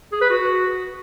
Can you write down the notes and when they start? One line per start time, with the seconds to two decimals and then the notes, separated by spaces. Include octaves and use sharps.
0.12 G#4
0.21 B4
0.30 F#4